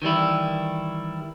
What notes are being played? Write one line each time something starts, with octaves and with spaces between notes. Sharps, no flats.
D#3 E3 G3 E4